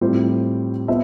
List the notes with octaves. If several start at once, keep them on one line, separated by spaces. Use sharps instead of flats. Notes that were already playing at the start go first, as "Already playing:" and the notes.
A2 G3 C4 F4 C5
B3 F4 C5 E5